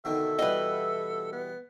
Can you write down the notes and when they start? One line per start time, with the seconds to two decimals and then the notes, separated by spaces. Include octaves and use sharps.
0.05 B2 D3 D#3 A4 E5
0.39 B2 E3 G3 B4 D#5
1.32 B3